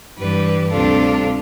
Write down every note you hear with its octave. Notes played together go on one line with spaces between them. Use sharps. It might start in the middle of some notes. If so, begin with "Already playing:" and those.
G2 E3 G3 B4
D2 C3 G3 D4 F4 A4